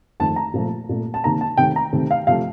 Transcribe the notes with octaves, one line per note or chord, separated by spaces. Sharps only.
F2 D#3 A3 A5
A#5
A#2 F3 A3
A#2 A3
A5
C3 D#3 A#3 A#5
A5
C3 D#3 A3 G5
A#5
C3 D#3 A3
F5
C3 F3 A3 F5